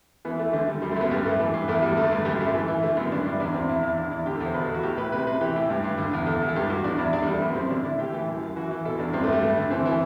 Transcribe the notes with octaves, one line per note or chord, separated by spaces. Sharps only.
E3 B3
E3 A3
D3 A3
D3 G3
F#2 G3
A3
F#2 B3
G2 G3
G2 A3
E3
G2
E2 A3
E2 G3
D3 A3
G2
F#2 G3
F#2 A3
E3
E3
D3 A3
F#2 B3
G2 D4
G2 E4
E2 D4
E2 C4
E2 E4
E2 E4
E2 D4
E2 E4
D3 G4
A4
E2
C5
B2 B4
A4
E2 F#4
A2 G4
A2 B4
C3 B4
C3 B4
E3 G4
A2
G2
G2
D3
E2
E2 A4
E2
A4
G2 G4
G2 F#4
E2 D4
E2 E4
E2 D4
G3
E2
A3
F#2 B3
F#2 C4
D3 D4
D3 E4
A2 G4
E3
F#2
F#2
E3 F#4
E3
B2 A4
E2 D4
G2 C4
A3
G2 G3
G2 A3
D3
E3 C4
E3